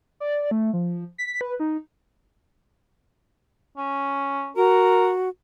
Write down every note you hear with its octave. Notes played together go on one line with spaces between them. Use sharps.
D5
A3
F3
B6
B4
D#4
C#4
F#4 A#4